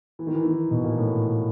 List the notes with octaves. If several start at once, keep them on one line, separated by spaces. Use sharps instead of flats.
E3
D#3
E3
D#3
B2
A#2
A2